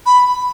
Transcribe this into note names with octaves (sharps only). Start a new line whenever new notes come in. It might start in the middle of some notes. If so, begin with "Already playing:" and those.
B5